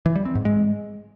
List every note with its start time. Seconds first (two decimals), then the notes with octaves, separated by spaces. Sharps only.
0.06 E3
0.16 G3
0.25 C4
0.35 G#2
0.45 G#3